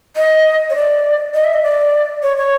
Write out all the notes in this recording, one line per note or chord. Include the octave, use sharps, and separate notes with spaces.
D#5
C#5
D5
D#5
E5
D#5
D5
C#5
C#5